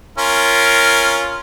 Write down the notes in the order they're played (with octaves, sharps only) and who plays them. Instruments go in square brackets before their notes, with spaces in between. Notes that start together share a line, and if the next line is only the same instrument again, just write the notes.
[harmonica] C#4 F4 A#4